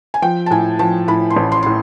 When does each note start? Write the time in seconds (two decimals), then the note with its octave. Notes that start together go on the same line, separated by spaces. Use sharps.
0.14 G#5
0.22 F3 G5
0.46 A5
0.51 A2 G#5
0.79 F3 A5
1.08 A2 B5
1.30 C6
1.36 A1
1.52 C6
1.63 A2 C6